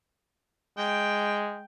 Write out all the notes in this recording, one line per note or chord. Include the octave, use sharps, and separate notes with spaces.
G#3 G5